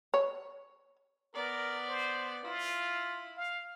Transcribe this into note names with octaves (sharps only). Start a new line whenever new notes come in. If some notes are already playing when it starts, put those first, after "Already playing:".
C#5
B3 A#4 D5
C5
E4 F4
F5